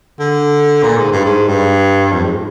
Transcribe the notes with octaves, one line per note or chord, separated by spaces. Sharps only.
D3
A#2
G#2
G2
G#2
G2
F2
G#2